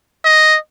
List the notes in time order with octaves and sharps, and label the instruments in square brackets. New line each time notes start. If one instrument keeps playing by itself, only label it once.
[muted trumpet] D#5